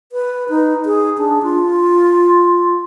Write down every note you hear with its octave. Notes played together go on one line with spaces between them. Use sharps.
B4
D#4
G#4
D4
F4